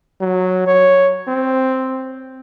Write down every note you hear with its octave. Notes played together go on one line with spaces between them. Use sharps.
F#3
C#5
C4